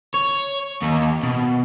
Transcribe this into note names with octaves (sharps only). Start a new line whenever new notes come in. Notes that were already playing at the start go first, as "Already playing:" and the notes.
C#5
D#2
B2